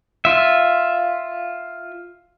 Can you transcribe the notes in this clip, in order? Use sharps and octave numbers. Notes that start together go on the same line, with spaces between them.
F4 E5